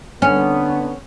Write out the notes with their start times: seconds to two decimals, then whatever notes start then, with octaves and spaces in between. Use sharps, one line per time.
0.22 D3 B3 C#4